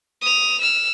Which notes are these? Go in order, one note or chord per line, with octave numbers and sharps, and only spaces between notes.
D#6 F7
E6 F6